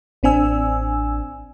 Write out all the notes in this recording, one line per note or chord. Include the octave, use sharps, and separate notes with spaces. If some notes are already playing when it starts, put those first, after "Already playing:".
A1 C4 D4 G#5 E6